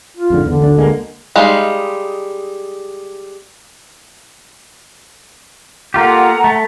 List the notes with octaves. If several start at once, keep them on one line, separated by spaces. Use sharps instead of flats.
F4
F2 G#2 D3
E2 D3
D2 E3 D4
D2 G#3 A#3
G3 G#3 D#4 F5
A#3 F4 G4 A4 F#5 A#5
A3